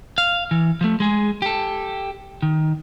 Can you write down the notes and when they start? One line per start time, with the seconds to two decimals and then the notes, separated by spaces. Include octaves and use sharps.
0.18 F5
0.51 E3
0.81 F3 A3
1.00 G#3 G#4
1.42 G4 A4
2.43 D#3